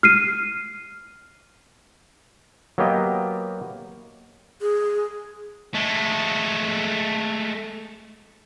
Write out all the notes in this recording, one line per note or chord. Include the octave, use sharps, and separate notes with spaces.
F6 C7 D#7
F#3 A#3 B3 G4 D#5
G#4
G#3 A3